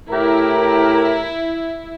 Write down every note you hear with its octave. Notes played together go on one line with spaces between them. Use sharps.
A2 E4 G4 A#4